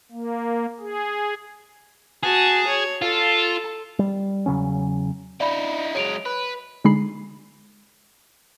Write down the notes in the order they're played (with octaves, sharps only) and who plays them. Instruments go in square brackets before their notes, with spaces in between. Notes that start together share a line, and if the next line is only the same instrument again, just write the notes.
[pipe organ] A#3
G#4
[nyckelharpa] F#4 A5 [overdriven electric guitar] G#4
[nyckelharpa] C#5
[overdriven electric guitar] F4 [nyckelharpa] A4 A5
[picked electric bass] G3
E2 C#3 F#3 C#4
[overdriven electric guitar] D#4 E4 [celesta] D5 B5
[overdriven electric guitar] F#3 G#3 [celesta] C#5 D7 F7
[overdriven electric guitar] B4
[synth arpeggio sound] D3 G#3 D#4 G#4 B5 C7